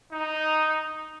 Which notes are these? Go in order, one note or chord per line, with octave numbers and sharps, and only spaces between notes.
D#4